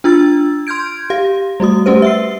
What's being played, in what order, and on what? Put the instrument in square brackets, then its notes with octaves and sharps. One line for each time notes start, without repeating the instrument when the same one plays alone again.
[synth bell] D4 F4 E6 A6
C6 F6 G6 G#6 D7
G4 F5
G3 A3 F#4 D#6
A3 C#4 G4 B4 C5
E5 E6 C7